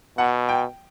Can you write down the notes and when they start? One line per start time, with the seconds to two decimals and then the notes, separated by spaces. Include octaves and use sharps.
0.18 B2 F#5
0.49 G5